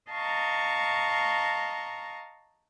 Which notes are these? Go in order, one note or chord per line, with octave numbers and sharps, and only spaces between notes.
D#5 F5 A5 A#5 C#6